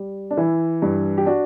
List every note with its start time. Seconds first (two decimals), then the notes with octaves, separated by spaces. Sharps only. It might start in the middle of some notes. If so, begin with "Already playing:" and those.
Already playing: G3
0.31 D4
0.37 E3 E4
0.82 G2
1.18 G4
1.26 D4 F#4